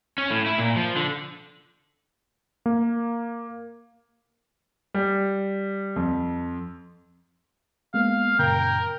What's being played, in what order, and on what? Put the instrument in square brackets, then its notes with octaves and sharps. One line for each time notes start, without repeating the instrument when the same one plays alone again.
[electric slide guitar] C#4
A2
E4
A#2
F3
D3
[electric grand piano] A#3
[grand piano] G3
F2
[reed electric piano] G#3 A#3 B3 [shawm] F5
[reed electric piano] F#2 A#2 C#3 [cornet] A#4 [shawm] G5